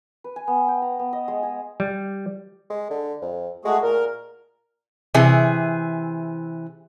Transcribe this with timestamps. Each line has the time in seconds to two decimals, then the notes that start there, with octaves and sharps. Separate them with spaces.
0.24 B4
0.36 G#5
0.48 B3
0.68 G5
0.82 A#5
0.99 B3
1.13 D#5
1.28 G#3
1.43 G#4
1.80 G3
2.70 G#3
2.91 D3
3.22 F2
3.65 G#3 A3 F#4 G#4
3.83 A#2 A#4
5.14 C3 E3 G#4